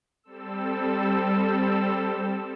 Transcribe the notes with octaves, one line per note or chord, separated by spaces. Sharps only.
G3 C4 A4 E6